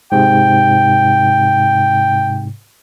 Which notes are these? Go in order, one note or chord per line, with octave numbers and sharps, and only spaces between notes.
G#2 C3 G5